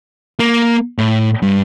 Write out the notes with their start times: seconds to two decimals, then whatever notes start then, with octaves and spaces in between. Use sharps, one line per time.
0.39 A#3
0.98 A2
1.42 G2